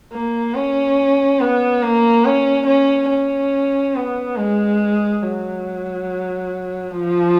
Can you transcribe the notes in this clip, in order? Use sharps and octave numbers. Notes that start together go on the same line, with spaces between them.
A#3
C#4
B3
A#3
C#4
C#4
C#4
B3
G#3
F#3
F3